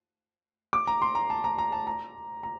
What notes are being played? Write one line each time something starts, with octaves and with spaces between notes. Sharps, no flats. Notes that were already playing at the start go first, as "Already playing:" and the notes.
D6
A#5
C6
A#5
A5
A#5
A#5
A5
A#5
A#5